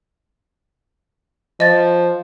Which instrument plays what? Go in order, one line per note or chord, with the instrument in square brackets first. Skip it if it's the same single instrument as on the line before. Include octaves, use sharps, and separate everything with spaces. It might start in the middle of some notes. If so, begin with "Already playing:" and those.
[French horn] F3 [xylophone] D#5 A6